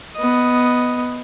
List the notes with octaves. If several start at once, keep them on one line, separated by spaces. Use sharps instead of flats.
B3 D#5